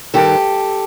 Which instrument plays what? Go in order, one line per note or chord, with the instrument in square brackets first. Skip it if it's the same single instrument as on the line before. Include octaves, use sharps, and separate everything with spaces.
[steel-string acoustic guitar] G2 D#3 G4 A4